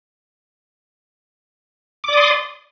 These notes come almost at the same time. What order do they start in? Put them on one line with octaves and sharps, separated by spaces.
D6 D5 D#6 C6